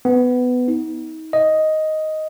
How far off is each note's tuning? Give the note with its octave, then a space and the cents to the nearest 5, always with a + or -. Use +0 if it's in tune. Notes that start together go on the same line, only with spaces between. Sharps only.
B3 +15
D#4 +35
D#5 +5